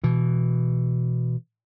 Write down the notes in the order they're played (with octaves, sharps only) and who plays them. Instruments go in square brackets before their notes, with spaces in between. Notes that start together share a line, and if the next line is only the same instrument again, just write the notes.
[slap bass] B2 E3